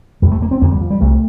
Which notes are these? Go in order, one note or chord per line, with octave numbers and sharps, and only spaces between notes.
F2 C3 G3
A3
A#3
C4
F2 D3 A#3
G3
F3
G3
C2 C3 A3